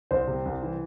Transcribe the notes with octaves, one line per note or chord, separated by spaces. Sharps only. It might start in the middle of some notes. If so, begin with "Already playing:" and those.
C2 C5
C3
C2
E3